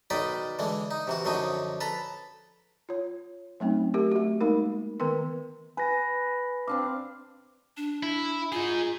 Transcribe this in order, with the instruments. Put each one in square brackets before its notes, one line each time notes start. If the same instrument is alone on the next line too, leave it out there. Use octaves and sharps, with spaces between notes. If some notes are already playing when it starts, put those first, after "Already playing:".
[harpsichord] B1 D#3 D#4 D5 D#5 B5
D3 E3 G#3
D#4
C3 E3 F#4
F#2 D3 F3 F#3 D#4 D#6
A4 B4 A#5 B5
[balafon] F4 C#5
F#3 A3 C4 C#4 D#4
A3 G4 A#4
A3 F#4
G#3 A#3 D#4 A#4
D#3 B3 A#4 B4 C6
[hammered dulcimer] B4 [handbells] G#5 A#6
[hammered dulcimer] C4 D4 F5 [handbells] D6
[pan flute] D4
[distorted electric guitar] E4
[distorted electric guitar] D#4 G#4 [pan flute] F4